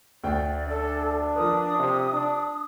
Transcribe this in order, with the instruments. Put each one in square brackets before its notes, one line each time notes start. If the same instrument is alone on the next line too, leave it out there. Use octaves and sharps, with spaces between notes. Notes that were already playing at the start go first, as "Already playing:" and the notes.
[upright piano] D2 G5 [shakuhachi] D5
[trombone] D4 [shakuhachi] A4
[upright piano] F3 A#4 B4 [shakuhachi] D#6
[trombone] C3
D4